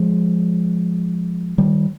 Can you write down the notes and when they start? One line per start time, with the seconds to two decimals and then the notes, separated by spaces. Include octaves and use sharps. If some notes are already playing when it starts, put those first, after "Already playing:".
Already playing: F3 G#3
1.58 D#3 G3